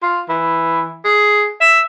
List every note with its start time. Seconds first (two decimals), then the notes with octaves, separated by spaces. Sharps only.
0.03 F4
0.29 E3
1.04 G#4
1.61 E5